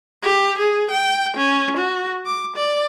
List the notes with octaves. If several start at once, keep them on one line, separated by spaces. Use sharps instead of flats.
G4
G#4
G5
C#4
F#4
D6
D5